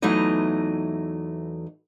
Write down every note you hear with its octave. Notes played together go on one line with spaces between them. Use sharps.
E2 E3 F#3 A3 D#4 D#5